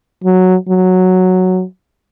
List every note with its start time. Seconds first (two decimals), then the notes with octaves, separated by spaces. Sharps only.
0.24 F#3
0.69 F#3